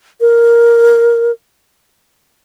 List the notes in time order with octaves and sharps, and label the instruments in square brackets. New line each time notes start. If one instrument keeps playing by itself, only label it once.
[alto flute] A#4